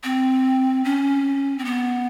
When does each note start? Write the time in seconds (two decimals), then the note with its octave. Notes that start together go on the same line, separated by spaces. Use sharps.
0.04 C4
0.84 C#4
1.58 C4
1.65 B3